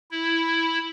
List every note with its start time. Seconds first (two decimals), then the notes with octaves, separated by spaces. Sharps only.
0.11 E4